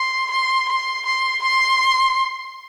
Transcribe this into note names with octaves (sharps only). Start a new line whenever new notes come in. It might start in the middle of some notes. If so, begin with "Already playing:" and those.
Already playing: C6
C6
C6
C6
C6